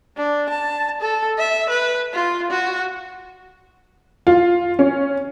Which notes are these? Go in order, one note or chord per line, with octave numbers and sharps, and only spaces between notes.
D4
A5
A4
E5
B4
F4
F#4
F4
C#4